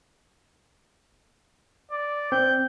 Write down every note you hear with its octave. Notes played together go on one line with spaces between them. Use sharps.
D5
C4 G6